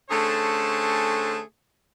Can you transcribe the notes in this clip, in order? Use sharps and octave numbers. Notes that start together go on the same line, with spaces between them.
D3 A3 C#4 G#4 C5 A5